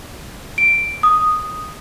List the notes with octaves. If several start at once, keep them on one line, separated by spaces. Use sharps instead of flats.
D7
D#6